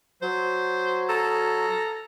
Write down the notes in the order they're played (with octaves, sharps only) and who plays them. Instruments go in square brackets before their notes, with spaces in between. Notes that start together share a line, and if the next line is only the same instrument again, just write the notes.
[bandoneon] F#3 [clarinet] C5
[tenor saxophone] A4 [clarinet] A#5